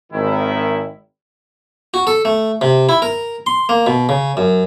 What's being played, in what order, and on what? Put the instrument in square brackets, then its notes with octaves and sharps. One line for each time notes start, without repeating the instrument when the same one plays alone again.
[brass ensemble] G#1 D#3 E4
[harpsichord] F#4
A4
A3
C3
E4
A#4
C6
A#3
B2
C#3
F#2